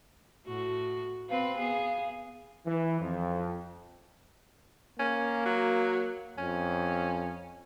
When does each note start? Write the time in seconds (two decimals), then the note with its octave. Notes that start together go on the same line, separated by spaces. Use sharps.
0.47 A2 F#4
1.30 C4 B4 F5
1.58 B3 G#4
2.66 E3
3.00 F2
4.99 A#3 C#4
5.45 F#3
6.38 F2 C#4